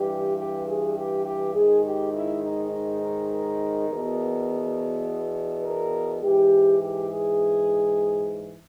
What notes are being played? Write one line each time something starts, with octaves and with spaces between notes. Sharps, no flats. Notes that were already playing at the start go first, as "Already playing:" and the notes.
Already playing: G2 E3 G4
G4
G#4
G4
G4
G#2 D#3 G#4
G4
E4
D#4
D#4
A#4
A#4
E2 B2
A#4
G#2 E3 G4
G4
G#4